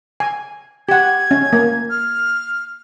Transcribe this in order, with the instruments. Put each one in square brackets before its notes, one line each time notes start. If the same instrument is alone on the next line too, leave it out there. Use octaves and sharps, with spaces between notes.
[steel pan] G#5
[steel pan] G4 F#5 [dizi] G#6
[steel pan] C#4
A#3
[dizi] F6